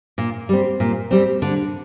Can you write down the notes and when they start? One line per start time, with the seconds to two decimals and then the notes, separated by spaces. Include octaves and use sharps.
0.18 A#2
0.49 G3 C4
0.80 A#2
1.11 G3 C4
1.42 D3